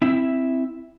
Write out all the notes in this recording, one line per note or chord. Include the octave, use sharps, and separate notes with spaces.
C4 E4 E5